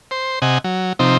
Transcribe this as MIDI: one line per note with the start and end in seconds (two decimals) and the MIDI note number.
0.11 0.39 72
0.42 0.58 48
0.42 0.58 75
0.42 0.58 78
0.42 0.58 80
0.64 0.93 54
0.99 1.17 48
0.99 1.17 53
0.99 1.17 60
0.99 1.17 63